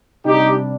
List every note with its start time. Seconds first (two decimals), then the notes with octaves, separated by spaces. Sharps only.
0.25 C3 G3 D4 D#4 G4